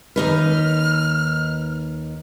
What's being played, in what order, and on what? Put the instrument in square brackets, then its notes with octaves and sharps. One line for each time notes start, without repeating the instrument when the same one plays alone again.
[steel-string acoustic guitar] D#2 D#4 B4 [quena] F6